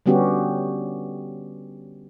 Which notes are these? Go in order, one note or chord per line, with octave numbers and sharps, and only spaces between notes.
D3 G3 B3 C#4 F#4 G4